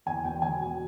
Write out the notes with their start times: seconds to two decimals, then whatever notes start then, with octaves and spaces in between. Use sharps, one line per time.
0.06 E2 G#5
0.24 E1 G5
0.42 E1 G#5
0.61 B2